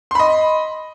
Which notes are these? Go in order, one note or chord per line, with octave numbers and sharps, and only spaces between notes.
D#5 B5 C6